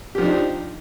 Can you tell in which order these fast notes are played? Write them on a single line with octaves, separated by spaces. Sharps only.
G4 F3 D4 D#4